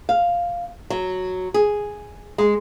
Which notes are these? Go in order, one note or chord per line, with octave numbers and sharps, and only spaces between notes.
F5
F#3
G#4
G#3